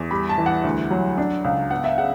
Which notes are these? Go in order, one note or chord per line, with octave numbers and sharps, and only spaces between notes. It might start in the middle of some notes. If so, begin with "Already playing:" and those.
Already playing: E2
G3 B5
A5
E3
F#5
D2
F#3
D4
C#2
B3 F#5
E5
C#3 F#5